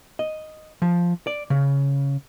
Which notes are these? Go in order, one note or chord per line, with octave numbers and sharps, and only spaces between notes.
D#5
F3
D5
C#3